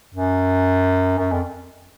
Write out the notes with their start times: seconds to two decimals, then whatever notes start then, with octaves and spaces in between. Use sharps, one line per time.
0.14 F#2
1.19 F#2
1.32 F2